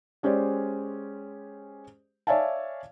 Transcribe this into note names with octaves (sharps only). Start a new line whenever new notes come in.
G#3 C#4 G4 C5 D5
C#5 D5 E5 F5 G#5 A5